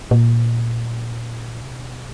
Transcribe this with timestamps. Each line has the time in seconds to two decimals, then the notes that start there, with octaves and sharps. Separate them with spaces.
0.11 A#2
1.63 C3
1.71 B2